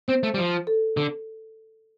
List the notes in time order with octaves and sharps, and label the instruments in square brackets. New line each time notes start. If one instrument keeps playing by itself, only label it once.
[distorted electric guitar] C4 [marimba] C5
[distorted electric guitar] A3
G3
F3
[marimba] A4
[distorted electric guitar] D3